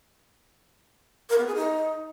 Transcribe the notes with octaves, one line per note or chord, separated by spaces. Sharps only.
A#4
B3
G#4
D#4